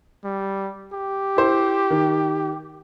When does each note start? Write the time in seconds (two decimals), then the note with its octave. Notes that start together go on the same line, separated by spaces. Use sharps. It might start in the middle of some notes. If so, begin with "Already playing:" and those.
0.24 G3
0.93 G4
1.37 E4 C5
1.90 D#3